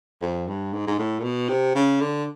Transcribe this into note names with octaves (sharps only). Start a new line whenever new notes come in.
F2
G2
G#2
G#2
A2
A#2
B2
C3
C#3
D3